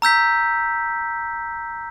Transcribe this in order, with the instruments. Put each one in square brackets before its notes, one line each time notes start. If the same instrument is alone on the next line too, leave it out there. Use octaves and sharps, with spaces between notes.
[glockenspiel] A#5 E6 G6 B6